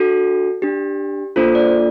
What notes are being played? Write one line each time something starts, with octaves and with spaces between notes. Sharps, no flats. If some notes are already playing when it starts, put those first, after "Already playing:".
Already playing: D4 F#4 A4
D4 G4
A#3 D4 F4 A4 C5
D5